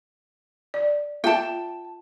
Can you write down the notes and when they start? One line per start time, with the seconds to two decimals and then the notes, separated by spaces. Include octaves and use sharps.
0.74 D5
1.24 F4 E5 G5 A5